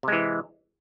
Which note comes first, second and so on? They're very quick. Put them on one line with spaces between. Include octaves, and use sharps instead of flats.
C3 G#3 E3